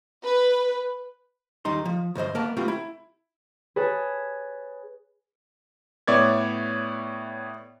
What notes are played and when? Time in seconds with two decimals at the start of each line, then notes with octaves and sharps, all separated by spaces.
0.24 B4
1.65 D#2 G3 D#4 C6
1.85 F3
2.15 D2 G2 C5 D#5
2.35 A#3 B3 A#4 A5
2.57 G3 A3 B3 C4 F4
2.68 E4
3.76 G#4 B4 C#5 G#5 A5
6.07 A2 B3 C#5 D5 E5 G#6